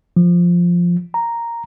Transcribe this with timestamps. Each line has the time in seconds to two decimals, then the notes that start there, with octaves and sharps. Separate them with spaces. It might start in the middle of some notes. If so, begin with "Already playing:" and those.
0.17 F3
1.14 A#5